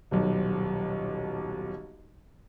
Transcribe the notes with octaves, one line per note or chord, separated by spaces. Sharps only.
D#1 B1